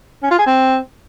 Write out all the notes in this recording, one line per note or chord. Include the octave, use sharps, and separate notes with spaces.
C#4
F4
G#4
C4